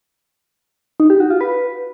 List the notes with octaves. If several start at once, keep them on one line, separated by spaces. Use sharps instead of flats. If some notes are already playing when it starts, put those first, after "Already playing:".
D#4
G4
F#4
F4
B4